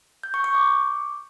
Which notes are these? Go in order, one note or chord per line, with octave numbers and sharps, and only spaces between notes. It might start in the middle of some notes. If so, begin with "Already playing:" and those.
G6
C#6
C#6
D6